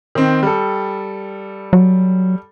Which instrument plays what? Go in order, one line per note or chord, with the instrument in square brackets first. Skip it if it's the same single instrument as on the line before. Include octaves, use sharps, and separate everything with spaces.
[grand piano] D#3 C4
G3 A4
[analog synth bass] F#3